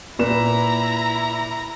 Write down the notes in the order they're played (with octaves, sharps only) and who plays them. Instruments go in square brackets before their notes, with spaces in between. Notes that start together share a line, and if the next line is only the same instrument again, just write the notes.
[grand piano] A#2 B4 E7 [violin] E4 A#5